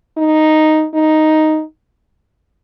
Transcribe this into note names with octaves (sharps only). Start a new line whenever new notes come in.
D#4
D#4